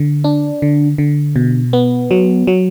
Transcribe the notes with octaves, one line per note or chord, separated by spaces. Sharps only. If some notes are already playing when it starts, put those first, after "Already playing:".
Already playing: D3
D4
D3
D3
B2
B3
F#3
F#3